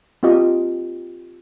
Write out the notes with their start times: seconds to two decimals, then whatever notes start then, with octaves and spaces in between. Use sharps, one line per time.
0.23 C4 F4 G4 D#5